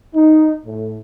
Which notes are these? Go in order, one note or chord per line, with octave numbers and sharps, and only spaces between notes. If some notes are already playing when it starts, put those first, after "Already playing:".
D#4
A2